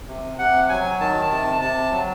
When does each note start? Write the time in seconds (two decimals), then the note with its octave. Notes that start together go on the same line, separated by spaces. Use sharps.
0.08 C3
0.38 C3 F#5
0.69 F#3 G#5
1.00 D#3 A5
1.31 C3 A5
1.61 C3 A5
1.91 F#3